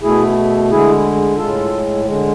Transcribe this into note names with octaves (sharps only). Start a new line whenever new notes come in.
B2 A3 E4 G#4
D3 G#3 E4 G#4
A2 G#3 F4 A4
D3 G#3